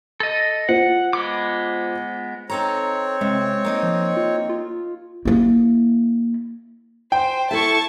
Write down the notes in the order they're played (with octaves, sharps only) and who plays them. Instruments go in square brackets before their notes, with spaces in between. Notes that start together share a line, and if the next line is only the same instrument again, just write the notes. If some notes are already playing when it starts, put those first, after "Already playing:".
[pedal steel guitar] A4 D#5
[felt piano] F4 C5 [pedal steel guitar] F#5
[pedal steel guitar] G#3 B3 D6
[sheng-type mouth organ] C4 C#5 [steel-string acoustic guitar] D#4 A4 A#5
[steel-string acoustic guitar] C3 [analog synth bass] G#3
[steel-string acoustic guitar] A#3 D#4 D#5
[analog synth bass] F3
F4
F4
[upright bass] A#3 E4
[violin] C5 [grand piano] G5
[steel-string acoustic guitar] E4 A4 E5 [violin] A5 C#6